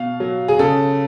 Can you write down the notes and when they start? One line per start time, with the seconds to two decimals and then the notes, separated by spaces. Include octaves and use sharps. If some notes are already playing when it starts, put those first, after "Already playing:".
Already playing: B2 F5
0.20 F#3
0.48 G#4
0.59 C#3 A4